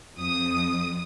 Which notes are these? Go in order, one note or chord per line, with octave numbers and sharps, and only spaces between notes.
F2 D#6